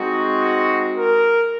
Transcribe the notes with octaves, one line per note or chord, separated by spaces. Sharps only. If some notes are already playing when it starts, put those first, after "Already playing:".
Already playing: G#3 C4 D#4 F#4
A#4